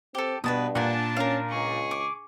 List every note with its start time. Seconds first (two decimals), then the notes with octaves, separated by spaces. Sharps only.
0.15 C4 G4 A4
0.44 G2 B2 B4 A5 D#6
0.75 A#2 D4 F#5 G#5 A5
1.17 C#4 A#4 F5
1.50 C#2 G#4 C#6
1.91 D6